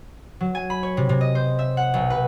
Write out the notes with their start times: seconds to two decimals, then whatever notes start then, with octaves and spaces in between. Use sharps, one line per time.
0.40 F#3
0.55 G#5
0.70 B5
0.83 C#5
0.97 C3
1.09 C3
1.21 D#5
1.35 C5
1.59 E5
1.77 F#5
1.94 B1
2.10 B4